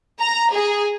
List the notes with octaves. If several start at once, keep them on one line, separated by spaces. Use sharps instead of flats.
A#5
G#4